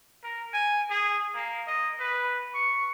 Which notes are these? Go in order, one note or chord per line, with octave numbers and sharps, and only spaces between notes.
A#4
G#5
G#4
A#3
D#5
B4
C#6